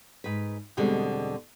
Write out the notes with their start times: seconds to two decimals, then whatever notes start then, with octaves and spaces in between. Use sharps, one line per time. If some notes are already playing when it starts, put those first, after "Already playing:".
0.24 G#2 B4
0.77 E2 B2 D3 G3 G#3 C4